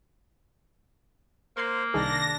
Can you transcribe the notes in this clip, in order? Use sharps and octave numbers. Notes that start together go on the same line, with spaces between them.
A#3 C5 C6 G#6 C7
C2 D#3 D4 G#4 A#6